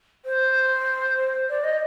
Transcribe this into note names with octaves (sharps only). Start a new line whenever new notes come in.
C5
D5
D#5